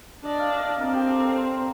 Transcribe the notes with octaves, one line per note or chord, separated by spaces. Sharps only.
D4 D#5
F5
D#5
D5
C4 A#4
G4
A4
A#4
C5